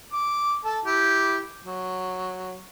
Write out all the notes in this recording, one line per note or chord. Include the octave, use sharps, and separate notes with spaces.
D6
A4 A5
E4 G4
F#3